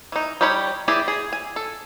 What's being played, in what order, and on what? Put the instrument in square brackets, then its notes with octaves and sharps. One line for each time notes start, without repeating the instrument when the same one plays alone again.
[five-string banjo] E3 D#4
G3 D#4 G4 C#5 B5
E3 E4 G4 G#4 D5
G#4
G#5
A4